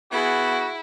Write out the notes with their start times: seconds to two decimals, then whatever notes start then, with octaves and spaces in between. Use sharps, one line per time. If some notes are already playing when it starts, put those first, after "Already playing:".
0.12 B3 E4 F#4 G#4 F#5